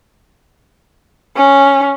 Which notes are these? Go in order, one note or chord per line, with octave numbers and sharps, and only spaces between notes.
C#4